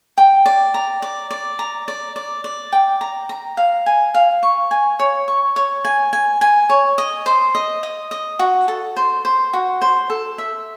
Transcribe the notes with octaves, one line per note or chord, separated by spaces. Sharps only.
G5
D5
A#5
D5
D5
A#5
D5
D5
D5
G5
A#5
A#5
F5
G#5
F5
C#6
G#5
C#5
C#6
C#5
G#5
G#5
G#5
C#5
D#5
C5
D#5
D#5
D#5
F#4
A4
C5
C5
F#4
C5
A4
E5